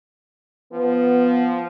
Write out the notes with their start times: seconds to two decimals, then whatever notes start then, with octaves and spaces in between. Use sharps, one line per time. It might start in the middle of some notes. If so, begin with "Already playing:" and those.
0.72 F3 B3